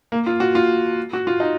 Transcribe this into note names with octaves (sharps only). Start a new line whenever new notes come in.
A#3
F4
F#4
F4
F#4
F4
D#4